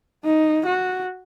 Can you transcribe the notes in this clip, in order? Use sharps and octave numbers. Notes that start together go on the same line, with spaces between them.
D#4
F#4